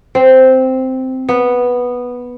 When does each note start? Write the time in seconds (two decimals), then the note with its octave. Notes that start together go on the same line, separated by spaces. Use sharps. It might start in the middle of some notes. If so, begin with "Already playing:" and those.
0.15 C4
1.29 B3